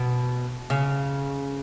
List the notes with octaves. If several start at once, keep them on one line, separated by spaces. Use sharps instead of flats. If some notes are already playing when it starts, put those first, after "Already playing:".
Already playing: B2
C#3